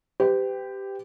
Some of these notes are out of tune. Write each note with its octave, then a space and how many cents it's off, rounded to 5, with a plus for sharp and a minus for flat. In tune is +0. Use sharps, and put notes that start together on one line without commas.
G4 +0 B4 +45